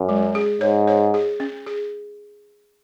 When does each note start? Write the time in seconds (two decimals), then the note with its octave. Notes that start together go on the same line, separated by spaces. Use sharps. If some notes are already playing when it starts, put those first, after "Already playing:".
Already playing: F#2
0.09 G#3
0.35 G#4
0.61 G#2 C#5
0.87 C#5
1.14 G#4
1.40 C#4
1.66 G#4